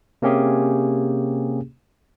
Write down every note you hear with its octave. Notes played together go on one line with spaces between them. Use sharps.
C3 A#3 C#4 G4 G#4